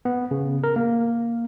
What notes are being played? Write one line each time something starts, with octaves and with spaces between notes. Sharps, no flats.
B3
C#3
A#4
A#3